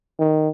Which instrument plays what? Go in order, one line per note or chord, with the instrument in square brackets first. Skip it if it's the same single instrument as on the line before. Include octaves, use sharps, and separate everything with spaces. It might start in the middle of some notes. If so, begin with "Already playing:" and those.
[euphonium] D#3